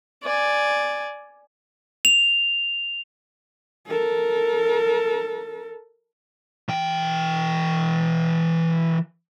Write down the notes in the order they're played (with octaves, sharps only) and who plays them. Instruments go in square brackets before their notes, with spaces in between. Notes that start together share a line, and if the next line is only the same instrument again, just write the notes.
[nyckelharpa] D5 G#5
[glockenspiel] F7
[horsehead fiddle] A4 A#4
[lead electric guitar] E3 G5